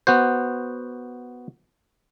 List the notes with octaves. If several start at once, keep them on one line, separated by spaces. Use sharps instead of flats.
B3 F#4 C5